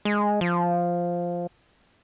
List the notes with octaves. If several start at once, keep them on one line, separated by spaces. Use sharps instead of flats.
G#3
F3